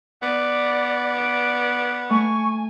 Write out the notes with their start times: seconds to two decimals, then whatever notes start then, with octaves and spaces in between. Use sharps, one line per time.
0.23 B3 D5 D#6
1.15 D5 D7
2.10 A3 G#5 C#6